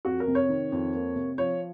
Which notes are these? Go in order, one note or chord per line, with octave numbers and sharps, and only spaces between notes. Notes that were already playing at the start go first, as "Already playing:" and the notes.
F2 F#4
A#4
C3
C#5
D#3
F2
A#3
C3
F3 C#5